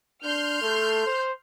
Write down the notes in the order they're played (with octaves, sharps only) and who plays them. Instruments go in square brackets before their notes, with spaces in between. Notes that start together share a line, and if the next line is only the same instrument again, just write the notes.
[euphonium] D4 [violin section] C6 F6 G6
[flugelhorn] A3 [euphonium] A4
[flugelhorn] C5